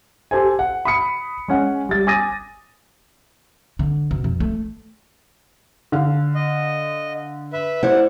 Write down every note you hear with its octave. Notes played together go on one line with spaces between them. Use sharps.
G4 A4 C5 G#5
F#5
B5 D#6 C#7
G#3 C#4 F#5
G3 A6
G#5 D6 D#6 A6 A#6 D#7
D3
B2
F2
A3
D3 F5
D#5
B4 E5
E4 C5 D5 F#5